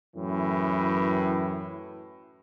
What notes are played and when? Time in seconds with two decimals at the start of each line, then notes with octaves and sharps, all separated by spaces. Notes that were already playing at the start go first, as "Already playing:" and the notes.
0.16 F#2 A2 E3